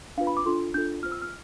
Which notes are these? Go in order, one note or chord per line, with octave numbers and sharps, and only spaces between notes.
D4 F4 B4 F5
B5
D6
D4 F4 A4 C6
D4 F4 A4 G6
F4 C5 F6
E6
F6